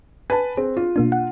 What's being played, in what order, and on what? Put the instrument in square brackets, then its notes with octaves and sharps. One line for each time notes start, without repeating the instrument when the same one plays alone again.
[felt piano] B4 A5 [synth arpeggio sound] G#5
[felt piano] C4 [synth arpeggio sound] G#4
[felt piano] F4
[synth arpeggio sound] B2 A#3 D4
F#5